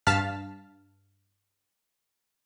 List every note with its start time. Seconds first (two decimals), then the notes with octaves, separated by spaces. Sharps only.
0.07 G2 F5 A5 F6 B6